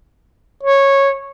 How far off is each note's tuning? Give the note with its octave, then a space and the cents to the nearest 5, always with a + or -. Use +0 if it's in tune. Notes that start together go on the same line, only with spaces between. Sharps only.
C#5 -10